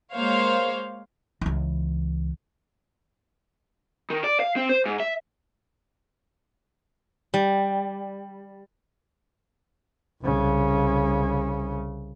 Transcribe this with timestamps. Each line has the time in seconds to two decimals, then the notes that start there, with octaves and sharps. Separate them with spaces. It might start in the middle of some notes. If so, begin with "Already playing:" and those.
0.14 G#3 A#3 C5 C#5 F5
1.41 C#2 E3
4.10 D#3
4.24 D5
4.40 F5
4.56 C4
4.69 C5
4.86 G#2
5.00 E5
7.34 G3
10.22 C2 C#3